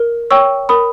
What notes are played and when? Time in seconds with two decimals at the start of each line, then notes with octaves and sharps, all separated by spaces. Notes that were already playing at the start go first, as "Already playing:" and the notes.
Already playing: A#4
0.31 C#5 G5 C#6 E6
0.69 A#4 B5 D#6